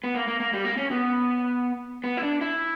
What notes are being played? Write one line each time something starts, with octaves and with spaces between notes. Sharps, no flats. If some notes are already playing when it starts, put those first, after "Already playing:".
B3
A#3
A#3
A#3
G3
A#3
C#4
B3
B3
E4
D4
E4